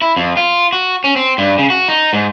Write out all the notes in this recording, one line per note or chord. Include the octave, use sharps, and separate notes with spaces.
E4
F2
F4
F#4
C#4
C4
G2
C#3
F#4
D#4
G#2